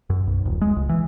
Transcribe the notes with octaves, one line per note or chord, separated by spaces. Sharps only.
F#2
B1
D#1
G#3
C#2
E3